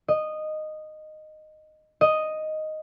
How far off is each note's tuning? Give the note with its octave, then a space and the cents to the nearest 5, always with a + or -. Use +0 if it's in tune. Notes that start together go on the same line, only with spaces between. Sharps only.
D#5 -10
D#5 +0